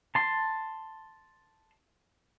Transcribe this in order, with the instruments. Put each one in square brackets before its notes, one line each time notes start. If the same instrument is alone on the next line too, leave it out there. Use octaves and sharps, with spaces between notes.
[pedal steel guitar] A5 C6